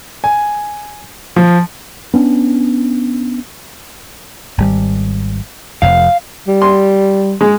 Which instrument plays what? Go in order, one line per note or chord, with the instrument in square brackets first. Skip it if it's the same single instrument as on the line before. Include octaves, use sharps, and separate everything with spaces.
[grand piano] G#5
F3
[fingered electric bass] B3 C#4 D4
[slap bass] G#1 G3
[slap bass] F1 F2 [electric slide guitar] F5
[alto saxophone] G3
[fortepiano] C6
G#3